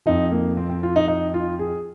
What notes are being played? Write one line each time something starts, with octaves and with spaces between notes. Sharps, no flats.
F2 F3 D#4
A#3
C4
C4
F4
D#4
D#4
F4
G#4